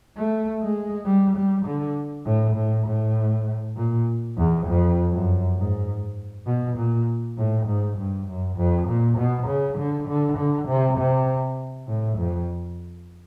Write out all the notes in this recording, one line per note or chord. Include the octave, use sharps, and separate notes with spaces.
A3
G#3
G3
G3
D3
A2
A2
A2
A#2
E2
F2
F#2
G#2
B2
A#2
A2
G#2
G2
F#2
F2
A#2
B2
C#3
D3
D3
D3
C3
C3
A2
F2